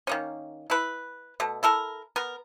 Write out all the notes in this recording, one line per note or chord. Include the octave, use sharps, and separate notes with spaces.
D#3 A#3 C#4
E4 B4
B2 A3
E4 A4 A#4
B3 A#4